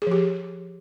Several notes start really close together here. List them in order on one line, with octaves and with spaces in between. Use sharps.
G#4 F3 G4